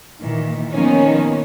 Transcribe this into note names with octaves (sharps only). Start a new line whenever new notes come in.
A#2 D#3 E3
D#3 F3 A#3 B3 C#4 D#4